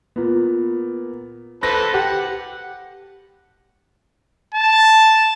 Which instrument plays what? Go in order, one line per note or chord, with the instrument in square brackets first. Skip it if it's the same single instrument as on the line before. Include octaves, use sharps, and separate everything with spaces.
[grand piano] A#2 B3
[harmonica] A4 B4 C5 [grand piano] A#6
[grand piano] G4 [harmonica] F#5
[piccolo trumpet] A5